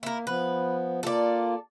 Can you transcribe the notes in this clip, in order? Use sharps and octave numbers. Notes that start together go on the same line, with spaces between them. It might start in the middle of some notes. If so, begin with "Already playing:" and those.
A#3 E4 A#4
F3 B3 B4
A#3 F4 A4 D5